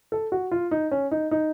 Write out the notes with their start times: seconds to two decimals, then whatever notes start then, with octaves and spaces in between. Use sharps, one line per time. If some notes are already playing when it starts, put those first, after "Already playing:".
0.12 A4
0.32 F#4
0.51 F4
0.71 D#4
0.91 C#4
1.11 D#4
1.31 D#4